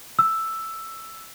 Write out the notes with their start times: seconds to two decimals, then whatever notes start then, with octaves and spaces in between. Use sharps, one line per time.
0.19 E6